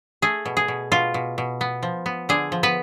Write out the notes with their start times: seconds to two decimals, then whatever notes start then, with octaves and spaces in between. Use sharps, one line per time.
0.22 A3 G#4
0.46 B2
0.57 G#4
0.68 B2
0.92 B2 F4
1.14 B2
1.38 B2
1.61 B3
1.83 F3
2.06 B3
2.29 D3 G#4
2.52 F3
2.63 B3 B4